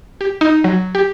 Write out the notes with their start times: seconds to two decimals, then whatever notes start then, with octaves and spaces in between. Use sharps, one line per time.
0.21 G4
0.41 D#4
0.64 F#3
0.95 G4